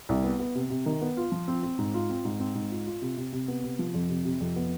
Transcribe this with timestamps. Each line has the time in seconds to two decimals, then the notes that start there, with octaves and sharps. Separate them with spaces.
0.09 C2
0.24 B3
0.39 B3
0.55 C3
0.70 C3
0.86 D#3
1.02 B3
1.17 F4
1.32 F3
1.48 C4
1.63 C4
1.78 G#2
1.94 F4
2.10 C4
2.25 G#2
2.40 C4
2.55 G#2
2.71 F4
2.86 F4
3.02 C3
3.17 C3
3.33 C3
3.48 B3
3.64 C3
3.79 F3
3.94 F2
4.09 C3
4.25 C3
4.40 F2
4.56 B3